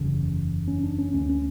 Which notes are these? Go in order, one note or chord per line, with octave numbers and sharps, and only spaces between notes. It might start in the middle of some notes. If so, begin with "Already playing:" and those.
Already playing: F#1 E2 C#3
C#4
D4
C#4
D2 D3 C#4
C#4